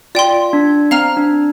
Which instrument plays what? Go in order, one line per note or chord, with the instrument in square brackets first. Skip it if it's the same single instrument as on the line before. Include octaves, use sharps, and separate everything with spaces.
[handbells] F4 [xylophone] D5 G5 C6
[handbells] D4
[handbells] C4 [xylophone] F5 A#5 F6
[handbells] D4